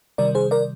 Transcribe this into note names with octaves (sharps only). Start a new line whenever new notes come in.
C3 D#3 G3 A#4 D5
G#4 C5
A#4 D5